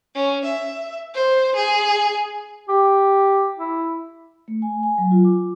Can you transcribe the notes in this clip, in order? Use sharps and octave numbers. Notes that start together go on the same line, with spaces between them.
C#4
E5
C5
G#4
G4
E4
A3
G#5
G#5
F#3
F4
D6